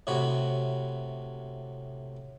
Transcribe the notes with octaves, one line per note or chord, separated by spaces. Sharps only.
A2 C3 F#4 B5